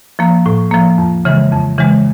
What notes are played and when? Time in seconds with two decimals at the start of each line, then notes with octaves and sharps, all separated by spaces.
0.19 F3 A#3
0.46 A2
0.71 F3 A#3
0.98 F2
1.25 C#3 E3 G#3
1.51 F2
1.78 C#3 E3 G#3